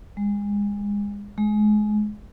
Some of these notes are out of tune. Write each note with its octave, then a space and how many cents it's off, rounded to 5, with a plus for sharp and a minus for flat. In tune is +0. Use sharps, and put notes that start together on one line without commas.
G#3 -30
G#3 +25